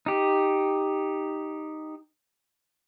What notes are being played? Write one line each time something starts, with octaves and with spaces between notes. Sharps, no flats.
D#4 G4